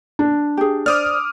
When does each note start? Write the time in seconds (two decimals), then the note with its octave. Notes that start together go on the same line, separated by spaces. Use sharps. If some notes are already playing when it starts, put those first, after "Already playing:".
0.19 D4
0.57 G4 G#4
0.86 C5 D5 D6 D#6 F6